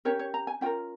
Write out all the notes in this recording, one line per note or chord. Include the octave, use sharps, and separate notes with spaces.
C#4 G4 A#4 C#5
C#5
A#5
G#5
C#4 F4 A#4 G5